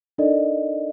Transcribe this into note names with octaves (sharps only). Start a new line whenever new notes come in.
D4 D#4 A4 A#4 D5 D#5